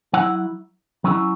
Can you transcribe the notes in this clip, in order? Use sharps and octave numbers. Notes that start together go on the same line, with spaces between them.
F#3 E4 F#5
F#3 C#4 E4